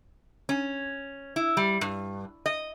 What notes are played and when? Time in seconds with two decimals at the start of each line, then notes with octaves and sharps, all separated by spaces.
0.49 C#4
1.36 E4
1.57 G3
1.81 G2
2.46 D#5